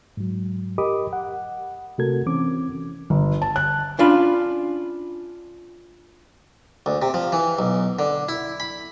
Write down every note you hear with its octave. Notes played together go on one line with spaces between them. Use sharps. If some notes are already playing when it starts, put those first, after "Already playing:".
G#2 F#3
G4 A#4 D#5 B5 D6 D#6
F#5
C3 A3 F#4 A4 A#4 G#6
E3 C4 C#4 D6
G1
A5
F#6
C#4 D4 F4 B5
D2
C3
F3
E3
B1
D3
E4
B5